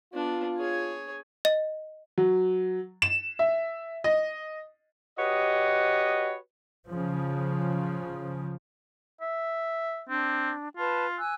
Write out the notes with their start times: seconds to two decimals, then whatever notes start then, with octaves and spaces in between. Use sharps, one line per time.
0.14 B3 D4 F4
0.56 G#4 C#5
1.45 D#5
2.18 F#3
3.02 E7
3.39 E5
4.04 D#5
5.18 F#4 G4 B4 C#5 D#5
6.88 C#3 F3
9.21 E5
10.09 C4 D4
10.77 F4 B4 A5
11.17 G#5 E6 F#6